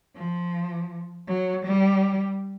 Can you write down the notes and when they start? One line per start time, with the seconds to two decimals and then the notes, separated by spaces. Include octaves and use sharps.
0.16 F3
1.28 F#3
1.66 G3